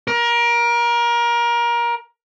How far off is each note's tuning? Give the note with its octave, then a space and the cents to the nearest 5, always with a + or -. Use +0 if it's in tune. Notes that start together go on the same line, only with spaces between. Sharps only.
A#4 +25